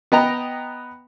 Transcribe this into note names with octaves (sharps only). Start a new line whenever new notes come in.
B3 D#5 G5 A#5